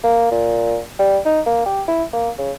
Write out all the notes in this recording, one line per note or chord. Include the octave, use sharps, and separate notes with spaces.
A#3
A#2
G3
D#4
A#3
G4
E4
A#3
C#3